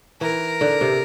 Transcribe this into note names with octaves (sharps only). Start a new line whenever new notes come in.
E3 A#4
D3
C3